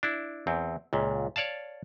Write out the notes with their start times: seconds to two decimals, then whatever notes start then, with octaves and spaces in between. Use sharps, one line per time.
0.03 D4 E4
0.47 E2 C4
0.93 C#2 A#2
1.36 C#5 D5 F5 A5